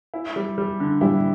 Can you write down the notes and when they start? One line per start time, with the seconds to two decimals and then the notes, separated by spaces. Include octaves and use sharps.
0.14 E4
0.36 G3
0.58 G3
0.80 D3
1.01 G3 E4